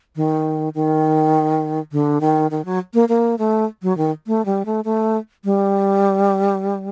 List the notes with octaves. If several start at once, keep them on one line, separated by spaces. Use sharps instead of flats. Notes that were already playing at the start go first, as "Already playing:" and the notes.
D#3
D#3
D3
D#3
D#3
F#3
A#3
A#3
A3
F#3
D#3
A3
G3
A3
A3
G3